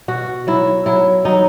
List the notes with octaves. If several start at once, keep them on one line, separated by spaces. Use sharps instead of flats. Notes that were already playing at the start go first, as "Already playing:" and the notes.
B2 F#4
F#3 E4
F#3 E4
F#3 D#4